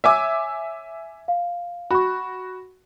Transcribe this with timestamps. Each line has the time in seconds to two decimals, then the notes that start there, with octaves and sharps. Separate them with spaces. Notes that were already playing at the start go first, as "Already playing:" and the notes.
0.04 C#5 E5 G#5 D6 E6
1.28 F5
1.91 F#4 B5 C#6